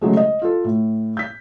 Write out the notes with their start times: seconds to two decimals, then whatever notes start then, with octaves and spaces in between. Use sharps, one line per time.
0.01 C#3 F#3 G#3 A3
0.17 D#5
0.42 F4 A4
0.64 A2
1.17 G6 B6